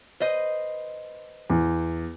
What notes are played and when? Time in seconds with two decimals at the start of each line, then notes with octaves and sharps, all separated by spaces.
0.20 B4 C5 D#5
1.50 E2